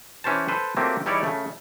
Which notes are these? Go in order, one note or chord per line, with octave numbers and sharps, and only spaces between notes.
E3 C#4 G4 C5 A5
A4 B4 C5
F#3 A3 A#3 C4 F4 G4
E2 G3 D#4 E4 C#5 D5
C#3 A3